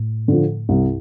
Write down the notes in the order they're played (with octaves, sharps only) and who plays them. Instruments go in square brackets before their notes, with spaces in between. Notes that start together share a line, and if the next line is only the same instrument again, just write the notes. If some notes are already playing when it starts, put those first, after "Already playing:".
Already playing: [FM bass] A2
[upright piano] D3 F3
[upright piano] C2 [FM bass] G2